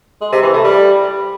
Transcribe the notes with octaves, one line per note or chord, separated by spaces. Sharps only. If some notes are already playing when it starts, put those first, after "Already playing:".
G#3
C3
E3
A3
G3